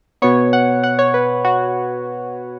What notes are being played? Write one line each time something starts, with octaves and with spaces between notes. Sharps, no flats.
B2 B3 C#5
F#5
F#5
C#5
B4
F#4